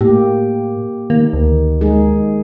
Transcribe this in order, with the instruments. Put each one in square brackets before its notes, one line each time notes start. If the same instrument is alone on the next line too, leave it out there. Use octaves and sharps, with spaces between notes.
[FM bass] A2 [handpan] A#3 G4
[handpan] D#3 [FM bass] A#3
[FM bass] D2
[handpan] G#3 D#4 G#4